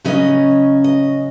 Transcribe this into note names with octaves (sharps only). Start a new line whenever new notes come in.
C#3 F#3 C#4 D#5
D#5